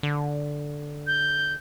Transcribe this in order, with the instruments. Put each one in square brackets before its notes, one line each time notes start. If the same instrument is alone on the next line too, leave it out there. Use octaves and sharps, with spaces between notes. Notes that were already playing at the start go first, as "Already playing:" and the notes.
[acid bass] D3
[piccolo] G6